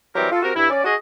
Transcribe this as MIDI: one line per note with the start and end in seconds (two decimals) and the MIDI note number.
0.16 0.28 52
0.16 0.28 54
0.16 0.28 55
0.16 0.28 60
0.16 0.28 67
0.16 0.28 70
0.31 0.40 65
0.31 0.40 69
0.42 0.51 60
0.42 0.51 66
0.42 0.51 67
0.42 0.51 70
0.55 0.67 43
0.55 0.67 64
0.70 0.81 61
0.70 0.81 74
0.84 0.94 66
0.84 0.94 68
0.84 0.94 75